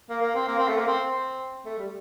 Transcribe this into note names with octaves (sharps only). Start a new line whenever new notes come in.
A#3
A#3
C4
A#3
C4
A3
A#3
C4
C4
A3
G3